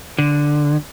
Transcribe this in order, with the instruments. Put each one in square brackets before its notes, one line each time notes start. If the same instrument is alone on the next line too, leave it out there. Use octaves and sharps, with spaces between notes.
[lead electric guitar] D3